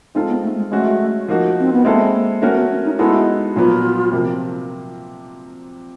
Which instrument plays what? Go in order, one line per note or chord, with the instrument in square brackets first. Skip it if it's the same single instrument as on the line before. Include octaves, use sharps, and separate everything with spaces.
[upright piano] G#3 C4 F4 A4 [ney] D#4
[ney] B3
A3
G#3
[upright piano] G#3 C#4 F#4 [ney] A3
[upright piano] F3 A#3 D#4 F#4
[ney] C4
B3
[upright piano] G#3 C4 E4 A4 [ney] A#3
[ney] A#3
[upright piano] A3 C#4 F#4 A#4 [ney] A#3
[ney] B3
C#4
D#4
[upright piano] G#3 B3 D#4 F#4 A4 [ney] E4
[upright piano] A#2 F#3 B3 [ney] F4
[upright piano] C3 F3 A#3